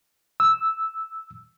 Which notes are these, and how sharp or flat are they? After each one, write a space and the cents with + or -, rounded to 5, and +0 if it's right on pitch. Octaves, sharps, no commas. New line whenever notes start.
E6 -5